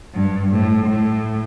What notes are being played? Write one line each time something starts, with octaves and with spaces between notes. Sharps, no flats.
G2
A2
A2